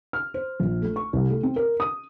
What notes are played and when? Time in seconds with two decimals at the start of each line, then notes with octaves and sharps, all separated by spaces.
0.13 F6
0.34 C5
0.60 A#1
0.82 A3
0.96 C#6
1.13 C2
1.30 A3
1.43 C4
1.56 A#4
1.80 D#6